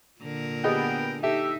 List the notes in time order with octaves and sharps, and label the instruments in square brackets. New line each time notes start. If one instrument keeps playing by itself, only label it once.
[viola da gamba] A#2 D3 A#4
[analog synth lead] B3 [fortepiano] G4 G#4 D#5 [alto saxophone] G5
[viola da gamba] D#4 [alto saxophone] G4 [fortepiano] A4 [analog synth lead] E5